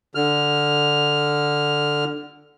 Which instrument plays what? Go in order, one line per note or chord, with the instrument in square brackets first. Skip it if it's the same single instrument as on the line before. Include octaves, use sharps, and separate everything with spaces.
[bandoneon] D3 F6